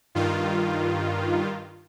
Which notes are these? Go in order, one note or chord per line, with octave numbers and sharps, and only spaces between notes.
G2 D#3 F4